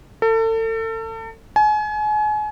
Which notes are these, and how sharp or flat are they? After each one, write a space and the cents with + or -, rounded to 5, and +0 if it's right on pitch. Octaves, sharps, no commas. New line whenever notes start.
A4 +35
G#5 +35